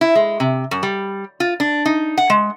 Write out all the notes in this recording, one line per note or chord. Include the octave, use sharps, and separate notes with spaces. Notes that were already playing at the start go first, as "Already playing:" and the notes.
E4
G#3
C3
F#2
G3
F4
D4
D#4
F#5
G#3